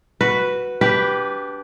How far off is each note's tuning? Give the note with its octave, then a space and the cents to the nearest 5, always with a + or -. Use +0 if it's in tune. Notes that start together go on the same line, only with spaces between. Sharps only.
F#4 +0 B4 +0
D4 -25 G4 +0 B4 +0